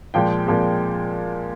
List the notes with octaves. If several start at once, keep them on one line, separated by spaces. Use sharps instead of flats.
A#2 F3 G#3 G5
A#2 F3 G#3